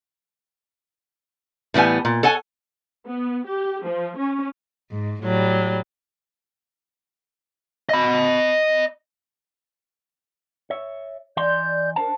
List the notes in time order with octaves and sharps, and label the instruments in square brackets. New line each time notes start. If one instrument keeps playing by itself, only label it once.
[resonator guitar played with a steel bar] A2 E3 G3 B3 G#5
A#2
A4 C#5 F#5 G#5
[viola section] B3
G4
F3
C#4
[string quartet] G#2
A2 F#3 G3
[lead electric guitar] D#5 B5
[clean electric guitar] C#5 E5
[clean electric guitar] E3 D#5 C6 [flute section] D5 G6
[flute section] D4 A#4 [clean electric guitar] C5 A5